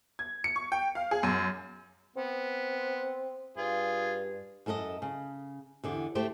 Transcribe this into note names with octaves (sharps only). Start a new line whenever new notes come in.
G#6
C#7
C#6
G5
F5
G#4
F#2
B3 C4
G2 F4 G#4
F#2 E4 A4 A#4 D#5
C#3
E2 D3 G4
A3 G4 C5